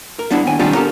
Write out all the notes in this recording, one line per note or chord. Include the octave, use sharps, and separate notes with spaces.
A#4
G3 B3 D4 E4 F#5
D#2 G5 G#5
D#3 G3 B3 C4 D4 F4
G4 A4 A#4